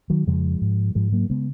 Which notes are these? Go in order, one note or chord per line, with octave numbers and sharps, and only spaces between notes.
D#3 F#3
F2 C#3 F3 G#3
G#2
G#2 F3 G#3
F#3 A#3
C#3 G#3 B3